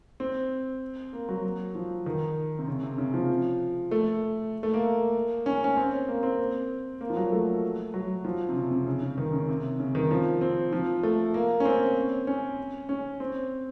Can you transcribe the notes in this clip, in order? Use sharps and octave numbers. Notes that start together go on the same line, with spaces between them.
C4
A#3
F#3
F3
D#3
C3
C#3
C3
C#3
F3
A3
A3
A#3
C#4
C#4
C4
A#3
C4
A#3
F3
F#3
A3
F#3
F3
C3
C#3
C3
C#3
C#3
D#3
C#3
C3
C#3
D#3
F3
C4
F3
A3
A#3
C#4
C4
C#4
C#4
C4